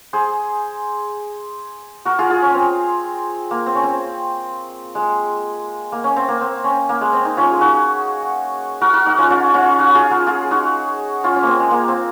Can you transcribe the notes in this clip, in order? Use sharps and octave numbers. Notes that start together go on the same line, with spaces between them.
G#4 C5
F#4 A#4
F4 G#4
F4 G#4
C#4
C4
A#3
C4
C#4
C4
G#3
A#3
C#4
C4
A#3
C4
C#4
A#3
G#3
C4
D#4
C#4 F4
G#4
D#4 F#4
F#4 A#4
F#4 A#4
D#4 F#4
C#4 F4
C#4 F4
C#4 F4
D#4 F#4
F4 G#4
F#4 A#4
F4 G#4
D#4 F#4
C#4 F4
C#4
A#3 C4
G#3
A#3
C4